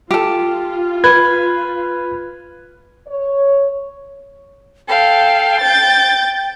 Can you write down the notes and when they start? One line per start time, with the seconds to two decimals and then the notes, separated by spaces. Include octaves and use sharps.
0.11 F4 G4 A4
1.04 B4 G#6
3.07 C#5
4.88 A4 F5 G5
5.61 G6 A6